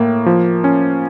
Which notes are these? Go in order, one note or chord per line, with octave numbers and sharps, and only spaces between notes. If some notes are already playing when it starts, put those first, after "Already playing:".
Already playing: A2 A#3
F3
C#4